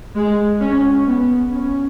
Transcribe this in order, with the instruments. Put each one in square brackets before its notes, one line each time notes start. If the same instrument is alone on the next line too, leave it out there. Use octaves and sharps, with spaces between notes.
[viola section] G#3
C#4
B3
C#4